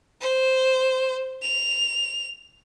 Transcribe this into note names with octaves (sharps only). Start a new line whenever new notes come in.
C5
F7